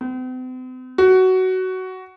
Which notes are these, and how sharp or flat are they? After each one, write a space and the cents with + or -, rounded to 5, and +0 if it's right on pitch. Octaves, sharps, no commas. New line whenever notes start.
C4 -45
F#4 +15